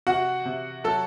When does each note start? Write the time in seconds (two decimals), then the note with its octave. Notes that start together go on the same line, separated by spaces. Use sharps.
0.07 C3 F#4 F#5
0.45 C3
0.84 F#3 A4 A5